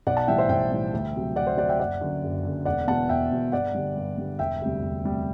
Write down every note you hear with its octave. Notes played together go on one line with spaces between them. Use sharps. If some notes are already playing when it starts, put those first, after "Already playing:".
B1 D5 F#5
F#5 A5
A2 E3 G3 E5 G5
C5 E5
B1 E5 G5
A2 E3 G3
D2
C3 F#3
D2 D5 F#5
C5 E5
C3 F#3 D5 F#5
E5 G5
F#1 D5 F#5
F#2 D3
F#1
F#2 D3
E1 D5 F#5
E2 B2 F#5 A5
E1 E5 G5
E2 B2
G2 D5 F#5
D3 G3
G2
D3 G3
E1 E5 G5
D2 C3 G3
E1
D2 C3 G3